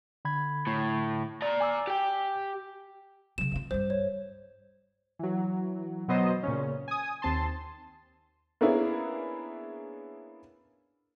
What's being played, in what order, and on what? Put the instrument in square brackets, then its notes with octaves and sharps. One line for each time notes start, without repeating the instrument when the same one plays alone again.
[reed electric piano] D3 B5 G#6
[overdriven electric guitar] A2
D5 A#5
[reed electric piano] G#5 D6 E6
[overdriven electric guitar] G4 G5
[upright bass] C#3 F#3 [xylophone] E7
[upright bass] G2 F4
[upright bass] G2 G3 [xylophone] C5
[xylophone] C#5
[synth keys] E3 F#3
B2 F#3 B3 C5 D#5
A#2 C#3 C#4
G#5 D#6
D#2 C4 A5 C6
[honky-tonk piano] A#3 B3 C#4 D4 E4 G#4